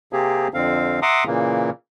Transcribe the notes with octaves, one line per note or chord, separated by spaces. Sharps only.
C3 A#3 C4 G4 G#4
F2 D3 C4 F5
E5 F#5 A#5 C6 D6 D#6
A#2 C#3 E3 A#3